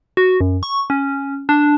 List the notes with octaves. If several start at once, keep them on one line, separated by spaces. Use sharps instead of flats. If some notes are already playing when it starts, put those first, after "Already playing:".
F#4
F#2
C#6
C#4
D4